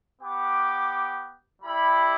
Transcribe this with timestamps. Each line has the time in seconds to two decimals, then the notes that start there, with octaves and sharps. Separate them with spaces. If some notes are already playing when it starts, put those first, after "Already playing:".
0.22 B3 G4 D6
1.62 G3 E4 G4 B5